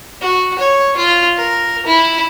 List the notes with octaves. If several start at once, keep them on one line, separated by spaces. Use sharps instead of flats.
F#4
C#5
F4
A#4
E4